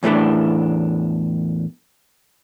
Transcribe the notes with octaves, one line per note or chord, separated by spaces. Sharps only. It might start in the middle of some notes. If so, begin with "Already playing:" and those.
E2 A2 E3 A3 D4